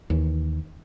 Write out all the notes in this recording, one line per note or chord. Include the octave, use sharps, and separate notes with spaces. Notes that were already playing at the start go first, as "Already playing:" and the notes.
D#2 E3